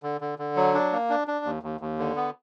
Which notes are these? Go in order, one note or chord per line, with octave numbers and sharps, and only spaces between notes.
D3
D3
D3
F#3
D4
A#3
D4
D4
D#2
D#2
D#2
D3
B3